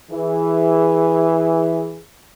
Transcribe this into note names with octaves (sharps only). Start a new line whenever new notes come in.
E3 G#4